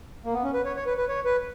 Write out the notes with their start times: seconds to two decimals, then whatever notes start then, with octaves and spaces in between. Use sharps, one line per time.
0.25 A#3
0.34 B3
0.44 C#4
0.54 B4
0.65 C#5
0.76 C#5
0.86 B4
0.97 B4
1.09 C#5
1.25 B4